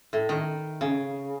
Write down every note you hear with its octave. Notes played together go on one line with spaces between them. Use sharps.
A2
D#3
C#3